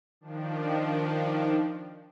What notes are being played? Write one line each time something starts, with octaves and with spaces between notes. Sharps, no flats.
D#3 F3 D4